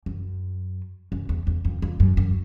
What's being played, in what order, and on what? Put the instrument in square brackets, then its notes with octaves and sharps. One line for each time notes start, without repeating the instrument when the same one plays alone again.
[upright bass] F#2
F#2
E2
E2
F2
F2
F#2
F#2